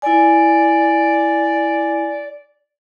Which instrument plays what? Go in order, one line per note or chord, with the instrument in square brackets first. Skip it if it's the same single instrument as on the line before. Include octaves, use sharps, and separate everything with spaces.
[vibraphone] E4 G#5 [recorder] D5